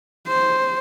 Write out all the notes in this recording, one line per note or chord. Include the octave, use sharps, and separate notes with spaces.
C5